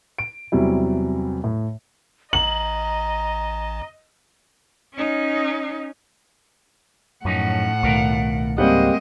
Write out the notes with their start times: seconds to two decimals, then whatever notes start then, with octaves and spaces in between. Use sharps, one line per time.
0.18 D7
0.52 E2 C3 F#3 G3 E4
1.44 A2
2.33 A1 D#5 A#5 F#7
4.93 C#4 D#4
7.25 F#2 A2 F3 C#4 D#4 F#5
7.83 C2 B2 D#3 A3 A#4 F5
8.58 C#2 G#2 G3 G#3 A#3 C4 D#5 F#5